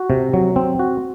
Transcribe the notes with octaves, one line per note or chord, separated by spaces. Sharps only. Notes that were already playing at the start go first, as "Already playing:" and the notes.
Already playing: F#4
C3
F#3
C4
F#4